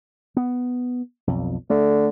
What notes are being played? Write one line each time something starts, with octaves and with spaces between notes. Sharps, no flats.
B3
B1 F2
D3 A3